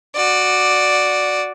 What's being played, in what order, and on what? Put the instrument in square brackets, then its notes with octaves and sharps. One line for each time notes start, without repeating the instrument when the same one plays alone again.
[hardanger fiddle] F#4 D5